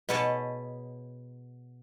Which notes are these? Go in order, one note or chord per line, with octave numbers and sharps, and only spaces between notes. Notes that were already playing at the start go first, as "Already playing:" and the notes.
B2 G#4 B4 C#5 D#5 A5